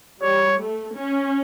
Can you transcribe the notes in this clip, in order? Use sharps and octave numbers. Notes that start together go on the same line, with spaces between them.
G3 C#5
A3
C#4